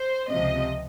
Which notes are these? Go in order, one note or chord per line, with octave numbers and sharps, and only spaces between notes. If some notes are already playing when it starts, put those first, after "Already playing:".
Already playing: C5
C#2 C3 F3 D#5